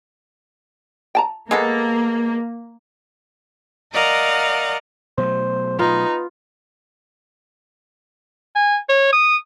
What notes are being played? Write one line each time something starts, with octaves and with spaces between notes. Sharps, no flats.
G5 A5 A#5
G#3 A#3 B3 A4
A#4 D5 D#5 F5 F#5 A#5
B2 F#3 A3 C5
B3 D#4 F4
G#5
C#5
D#6